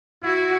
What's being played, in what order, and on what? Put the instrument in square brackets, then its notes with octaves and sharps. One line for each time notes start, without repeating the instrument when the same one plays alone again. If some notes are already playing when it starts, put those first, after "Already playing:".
[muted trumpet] E4 [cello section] F#4